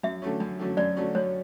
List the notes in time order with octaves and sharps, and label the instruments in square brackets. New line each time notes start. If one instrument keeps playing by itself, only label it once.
[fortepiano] F#2 [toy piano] E5
[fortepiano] D3 F#3 A3 C#4
F#2
D3 F#3 A3 C#4
[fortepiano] F#2 [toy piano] D5
[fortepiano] D3 F#3 A3 C#4
[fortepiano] F#2 [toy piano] C#5